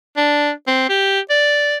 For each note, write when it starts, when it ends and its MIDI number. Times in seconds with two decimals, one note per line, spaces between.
0.17 0.51 62
0.67 0.87 60
0.90 1.20 67
1.30 1.77 74